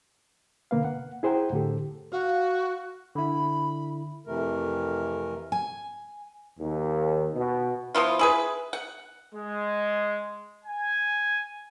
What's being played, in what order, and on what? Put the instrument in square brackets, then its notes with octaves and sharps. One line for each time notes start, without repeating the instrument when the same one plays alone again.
[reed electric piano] B2 D3 A#3 B4 F5
F#5
E4 G#4 C5 F#5 G5 A#5
A2 D3 G4 A4
[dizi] F#4 [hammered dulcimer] F5
[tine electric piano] D3 E4 [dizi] B5
[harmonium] F2 C3 E3 A3 A#4
[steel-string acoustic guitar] G#5
[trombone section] D#2
B2
[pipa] F3 B3 E4 F4
E4 G#4 B4
F#5
[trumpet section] G#3
G#5